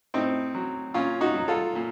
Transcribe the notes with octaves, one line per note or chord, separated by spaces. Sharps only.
A2 C4 D#4
F#3
A#2 C#4 F4
D#4 F#4
F#3
F4 A4
A#2